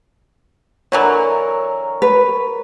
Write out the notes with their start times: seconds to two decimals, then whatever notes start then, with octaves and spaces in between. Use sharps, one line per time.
0.92 D3 E3 F#3 A#4 C#5
2.02 B4